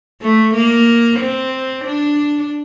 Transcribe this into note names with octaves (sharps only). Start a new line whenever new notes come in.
A3
A#3
C4
D4